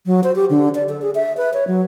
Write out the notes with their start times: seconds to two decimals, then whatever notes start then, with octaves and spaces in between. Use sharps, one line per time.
0.06 F#3
0.24 C5
0.36 G4
0.50 D3
0.75 D5
0.89 A4
1.02 G#4
1.15 E5
1.37 B4
1.54 C#5
1.67 F#3